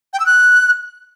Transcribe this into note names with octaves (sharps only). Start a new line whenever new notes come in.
G5
E6
F#6